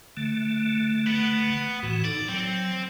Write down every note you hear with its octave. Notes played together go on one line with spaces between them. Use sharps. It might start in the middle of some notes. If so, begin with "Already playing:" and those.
D3 A3
B3
A2 E3 F#4
D#4 A4 D5
F#3 C4